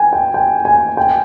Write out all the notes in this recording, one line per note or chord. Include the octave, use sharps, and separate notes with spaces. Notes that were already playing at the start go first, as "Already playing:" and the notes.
Already playing: G5 G#5
G5
G5
G#5
G5